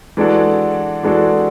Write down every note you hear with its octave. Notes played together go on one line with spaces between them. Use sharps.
E3 G#3 D4 F#4 A4
E3 G#3 D4 F#4 A4